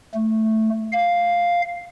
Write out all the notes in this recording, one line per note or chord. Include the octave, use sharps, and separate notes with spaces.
A3
F5